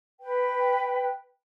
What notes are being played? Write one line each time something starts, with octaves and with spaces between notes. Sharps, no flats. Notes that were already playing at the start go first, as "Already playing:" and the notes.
B4 G5